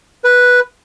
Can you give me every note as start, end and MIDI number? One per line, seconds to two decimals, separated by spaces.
0.24 0.60 71